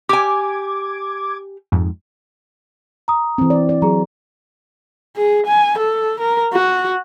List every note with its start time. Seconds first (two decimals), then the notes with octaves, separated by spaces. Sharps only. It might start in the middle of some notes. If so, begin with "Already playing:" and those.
0.09 G4 G#5 D6 G#6
1.72 F2 G#2
3.08 A#5 D#6
3.38 E3 C4
3.50 D5
3.69 D5
3.82 F#3 G#4 A#5
5.16 G#4
5.46 G#5
5.78 A4
6.20 A#4
6.53 F#4